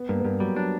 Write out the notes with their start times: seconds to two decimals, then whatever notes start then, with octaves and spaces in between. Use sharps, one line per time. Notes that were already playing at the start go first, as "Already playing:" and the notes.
Already playing: B3
0.09 G2 A#3
0.20 B3
0.24 G2 A#3
0.40 F#3 G3
0.56 F#3 D4